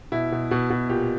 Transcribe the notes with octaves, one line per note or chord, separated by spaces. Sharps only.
B2 E4
B2
B2
B2
A#2 G4